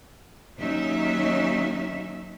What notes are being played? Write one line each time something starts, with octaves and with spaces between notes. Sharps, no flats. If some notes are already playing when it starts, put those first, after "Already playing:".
D#2 F#3 C#4 D#4 E5